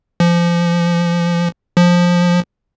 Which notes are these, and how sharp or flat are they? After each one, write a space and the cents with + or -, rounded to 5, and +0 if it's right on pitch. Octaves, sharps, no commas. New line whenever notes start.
F3 -25
F3 +10